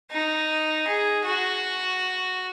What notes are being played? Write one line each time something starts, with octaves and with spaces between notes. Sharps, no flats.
D#4
G#4
F#4